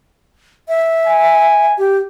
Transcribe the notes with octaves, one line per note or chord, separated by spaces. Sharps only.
E5
G#5
G4